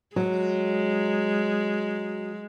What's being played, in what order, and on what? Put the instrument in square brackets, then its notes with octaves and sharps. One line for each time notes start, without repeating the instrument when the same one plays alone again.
[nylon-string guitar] F#3 [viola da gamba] G#3